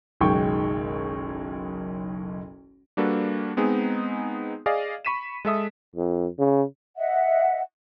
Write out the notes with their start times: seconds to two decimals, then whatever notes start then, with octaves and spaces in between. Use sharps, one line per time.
0.21 F#1 B1 D#3 G#3 G5 C#6
2.97 G3 A#3 D4 F#4 A4 B4
3.57 G#3 B3 C4 D#4 G#4
4.66 G#4 D5 D#5 F5
5.05 B5 C#6 B6 D#7 E7
5.45 G#3 A4 E5 D#6
5.95 F2
6.39 C#3
6.97 D#5 E5 F#5